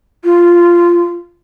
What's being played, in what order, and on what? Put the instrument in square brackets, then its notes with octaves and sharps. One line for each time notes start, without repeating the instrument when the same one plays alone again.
[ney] F4